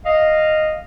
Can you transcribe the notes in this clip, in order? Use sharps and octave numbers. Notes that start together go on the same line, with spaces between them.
D#5 F5